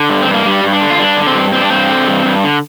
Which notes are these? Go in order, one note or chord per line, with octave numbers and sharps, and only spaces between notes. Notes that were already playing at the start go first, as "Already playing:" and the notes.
Already playing: D3
G2
C4
G2
A#3
G2 G3
G2
D4
D3
F4
G2 D4
D3
C4
G2
G2 C4
D4
G2 C4
D3
G2
G2
D3